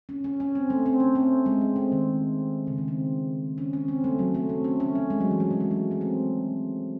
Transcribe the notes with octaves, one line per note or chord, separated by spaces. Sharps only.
C#4
C#4
C#4
C4
A3
C4
C#4
C4
G#3
A3
C4
D#3
C#3
D#3
C4
C#4
C#4
C4
A3
F#3
A3
C4
C#4
C#4
A3
G#3
F#3
E3
F#3
F#3
G#3
F#3
A3
C4